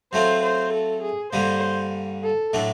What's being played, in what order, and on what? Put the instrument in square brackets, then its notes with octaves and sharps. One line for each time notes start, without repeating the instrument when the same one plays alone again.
[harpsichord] F#3 A3 C4 F4 [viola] C5
[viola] C5
A4
G#4
[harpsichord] G2 D3 G3 A#3 [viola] C5
[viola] A4
[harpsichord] A2 F#3 A3 D4